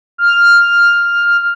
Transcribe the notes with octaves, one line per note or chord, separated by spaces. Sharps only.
F6